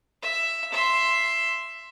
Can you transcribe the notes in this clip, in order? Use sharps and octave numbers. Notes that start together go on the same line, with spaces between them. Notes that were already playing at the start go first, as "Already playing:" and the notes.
E5
E5 C6